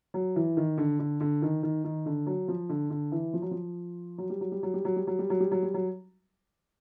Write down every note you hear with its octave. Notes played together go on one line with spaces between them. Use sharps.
F#3
E3
D#3
D3
D3
D3
D#3
D#3
D#3
D3
F#3
F3
D3
D3
E3
F3
F#3
F3
F#3
G3
F#3
G3
F#3
G3
F#3
G3
F#3
G3
F#3
G3
F#3
G3
F#3